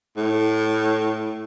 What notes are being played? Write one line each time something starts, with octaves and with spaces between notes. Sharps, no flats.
A2